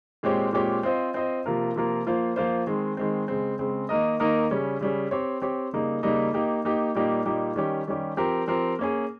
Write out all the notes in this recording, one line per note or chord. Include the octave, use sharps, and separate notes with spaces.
A#2 G#3 C4 G4 C#5
A#2 G#3 C4 G4 C#5
C4 F4 C5 D#5
C4 F4 C5 D#5
C3 F3 A#3 F4 A#4
C3 F3 A#3 F4 A#4
F3 A#3 F4 C5
F3 A#3 F4 C5
D#3 G#3 C4
D#3 G#3 C4
C#3 G#3 C4
C#3 G#3 C4
D#3 A#3 D#4 A#4 D#5
D#3 A#3 D#4 A#4 D#5
C#3 G3 C#4
C#3 G3 C#4
C4 G4 C#5
C4 G4 C#5
C#3 G3 A#3 D#4
C#3 G3 A#3 D#4
A#3 D#4 G4
A#3 D#4 G4
A#2 G3 A#3 D#4 G4
A#2 G3 A#3 D#4 G4
D#3 G3 C#4 G4
D#3 G3 C#4 G4
F3 C4 G4 A#4
F3 C4 G4 A#4
A#3 C#4 G#4